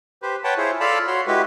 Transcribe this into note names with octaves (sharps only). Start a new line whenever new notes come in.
G4 B4 C5
B4 C#5 F#5 G5 A5
E4 F4 G#4 C5 C#5
F4 A4 D5 F5 A5 B5
F#4 C#5 B5 C6
G#3 E4 F#4 G4 B4